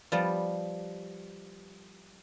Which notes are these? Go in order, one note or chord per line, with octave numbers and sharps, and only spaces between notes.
F3 G3 B3 D5